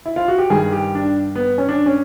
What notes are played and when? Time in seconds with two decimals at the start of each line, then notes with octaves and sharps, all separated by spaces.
0.06 E4
0.16 F4
0.28 F#4
0.38 G4
0.50 G2 D#3 G#4
0.72 G4
0.95 D4
1.36 B3
1.58 C#4
1.69 D4
1.86 C#4